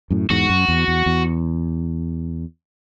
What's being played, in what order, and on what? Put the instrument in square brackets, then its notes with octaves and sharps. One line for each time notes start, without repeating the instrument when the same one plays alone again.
[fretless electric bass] F#2 A2
[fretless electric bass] E2 G#2 [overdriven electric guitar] F#4
[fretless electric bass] F#2
E2
E2
E2